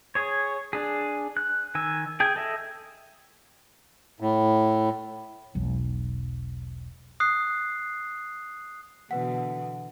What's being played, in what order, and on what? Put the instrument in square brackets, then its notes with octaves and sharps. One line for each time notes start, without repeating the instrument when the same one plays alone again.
[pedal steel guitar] G#4 C#5
D4 G#4
F#6
D#3 G#5 E6
G#4 G5 G#5
A4 D#5 E5
[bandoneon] A2
[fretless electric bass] E1 B1 F#3
[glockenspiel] D#6 F#6 C7
[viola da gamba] B2 D3 E3 [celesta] B4 F#5